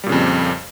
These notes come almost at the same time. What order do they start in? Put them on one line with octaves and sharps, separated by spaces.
G3 A#2 C#3 F2